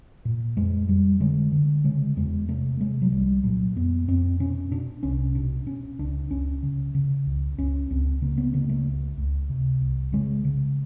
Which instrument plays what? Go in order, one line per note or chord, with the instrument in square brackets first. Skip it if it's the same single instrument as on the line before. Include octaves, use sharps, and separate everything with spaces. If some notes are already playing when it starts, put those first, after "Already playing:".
[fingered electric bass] A#2
F2 G#3
F2 G3
D3 G#3
D3
C#3 G#3
E2 G#3
C3 A3
C3 G#3
F#3
C2 G3
A#2 F#3
F2 B3
F2 C4
B2 C#4
B2 D4
C2 C#4
B2 D4
B2 C#4
C#2 D4
C#2 C#4
C#3
C#3
C#2
C#2 C#4
C#2 C4
C#3 A#3
B3
C#3 A#3
A3
C#2
C#2
C3
C2
C#3 G#3
C#3